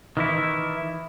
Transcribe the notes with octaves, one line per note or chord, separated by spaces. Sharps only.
D#3 E3 E4